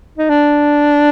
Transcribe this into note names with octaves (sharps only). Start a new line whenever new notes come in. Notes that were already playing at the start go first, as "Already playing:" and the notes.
D#4
D4